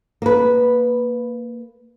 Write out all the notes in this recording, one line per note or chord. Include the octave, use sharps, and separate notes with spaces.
A#3 B4